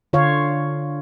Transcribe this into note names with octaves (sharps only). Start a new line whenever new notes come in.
D3 F4 C#5 F5